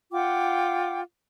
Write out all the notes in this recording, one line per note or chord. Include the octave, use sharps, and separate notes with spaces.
F4 F#5 G5 D6